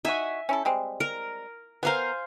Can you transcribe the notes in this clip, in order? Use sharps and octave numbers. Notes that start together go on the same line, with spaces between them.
D#4 F#4 E5 G#5
C#4 E4 A4
G3 G#3 C4
A#4
B3 A#4 C5 F5 G#5